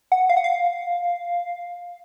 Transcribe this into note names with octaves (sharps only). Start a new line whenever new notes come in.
F#5
F5
F#5
F5